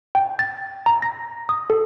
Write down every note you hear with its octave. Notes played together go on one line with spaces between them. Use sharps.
G5
A6
A#5
A#6
D#6
A4